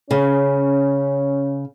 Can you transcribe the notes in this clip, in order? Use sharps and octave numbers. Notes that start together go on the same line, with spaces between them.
C#3 C#4